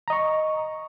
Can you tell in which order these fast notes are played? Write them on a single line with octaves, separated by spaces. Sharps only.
A#5 D#5 C#6